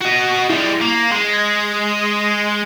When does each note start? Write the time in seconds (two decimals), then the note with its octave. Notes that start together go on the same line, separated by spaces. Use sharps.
0.02 F#4 D#5
0.50 G3 G#3 E4
0.81 A#3
1.12 G#3
1.30 G#6 A#6